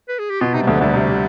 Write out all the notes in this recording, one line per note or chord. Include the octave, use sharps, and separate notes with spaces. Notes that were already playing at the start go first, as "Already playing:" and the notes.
B4
G#4
G4
B2 F4
C3 D#4
G3
D2 D3 F3
D2 D3 G3
C3
C3